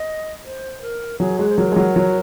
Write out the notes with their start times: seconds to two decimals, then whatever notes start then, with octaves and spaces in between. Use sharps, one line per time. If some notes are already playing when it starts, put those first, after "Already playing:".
Already playing: D#5
0.45 C5
0.82 A#4
1.20 F#3 G#4
1.39 G#3 F#4
1.49 C5
1.58 F#3 A#4
1.72 G#3
1.76 F#3 A#4
1.96 F#3